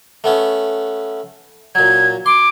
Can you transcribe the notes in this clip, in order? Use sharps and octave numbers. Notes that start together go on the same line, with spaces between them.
A3 B3 C#4
A#2 F#3 G#6
C6 D6